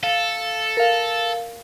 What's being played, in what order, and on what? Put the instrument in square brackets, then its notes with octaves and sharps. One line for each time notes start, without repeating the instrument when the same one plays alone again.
[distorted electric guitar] A4 [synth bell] F5
[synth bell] A#4 F5